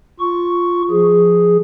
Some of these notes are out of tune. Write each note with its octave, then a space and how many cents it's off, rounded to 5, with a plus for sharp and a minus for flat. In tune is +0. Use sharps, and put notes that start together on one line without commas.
F4 +0 C#6 +5
F3 +0 G#4 +0